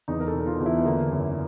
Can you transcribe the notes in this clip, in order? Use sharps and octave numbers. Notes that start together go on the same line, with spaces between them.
E2 D#4
A#4
A4
B2
F4
E2
E4
B3
D3 A#3
F#2